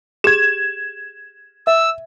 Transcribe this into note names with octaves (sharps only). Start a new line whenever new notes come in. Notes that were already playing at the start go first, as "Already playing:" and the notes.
G4 G#4 G#6 E7
E5 E6